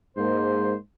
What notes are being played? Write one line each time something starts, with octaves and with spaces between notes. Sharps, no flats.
G#2 G#3 A#3 C5